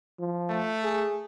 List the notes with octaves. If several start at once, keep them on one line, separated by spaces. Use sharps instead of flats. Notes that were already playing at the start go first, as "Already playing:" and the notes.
F3
A3
G#4